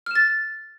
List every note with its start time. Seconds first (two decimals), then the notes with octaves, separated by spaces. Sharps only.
0.06 F6
0.11 E7
0.15 A6